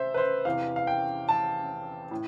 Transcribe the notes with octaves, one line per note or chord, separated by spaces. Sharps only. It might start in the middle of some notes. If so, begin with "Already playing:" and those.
Already playing: C3 C5 E5
B4
C5
E2 C3 E3 F5
F5
G5
A5
A2